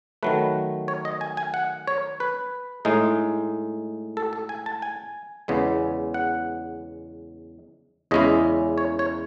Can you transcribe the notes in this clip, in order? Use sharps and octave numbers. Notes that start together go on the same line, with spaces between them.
D#3 F#3 A3 B4
C#5
D#5
G#5
G#5
F#5
C#5
B4
A2 G#3 D#4
A4
A4
G#5
A5
G#5
E2 C#3 G#3 B3
F#5
E2 C#3 G#3 C#4 E4 D#5
C#5
C#5